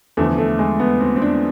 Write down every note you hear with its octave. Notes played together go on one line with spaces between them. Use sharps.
E2 D3 F3 A3
A3
G#3
B3
C4
C4
D4